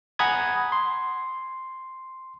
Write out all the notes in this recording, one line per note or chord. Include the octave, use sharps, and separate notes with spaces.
F#5 G#5 A#5 B5 D#6 G#6
C6